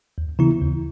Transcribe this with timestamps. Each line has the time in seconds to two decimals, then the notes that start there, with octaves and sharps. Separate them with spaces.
0.18 D#2
0.39 C#3 E3 B3 E4
0.62 D#2